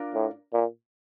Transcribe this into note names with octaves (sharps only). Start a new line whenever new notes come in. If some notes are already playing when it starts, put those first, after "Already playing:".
Already playing: D4 F4 A#4 D5
A2
A#2